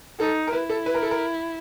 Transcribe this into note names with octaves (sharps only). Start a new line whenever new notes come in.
D#4 A4
A#4
E4 B4
A4
B4
A#4
A4
A#4